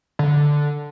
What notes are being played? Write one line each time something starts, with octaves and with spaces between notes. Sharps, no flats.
D3